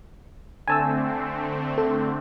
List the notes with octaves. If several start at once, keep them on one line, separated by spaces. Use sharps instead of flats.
D3 A3 C4 G#5 A5 E6
A4